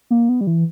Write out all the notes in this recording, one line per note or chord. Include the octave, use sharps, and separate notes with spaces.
A#3
B3
G3
E3